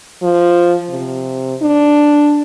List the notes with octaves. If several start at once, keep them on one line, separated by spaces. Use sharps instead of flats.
F3
C3
D4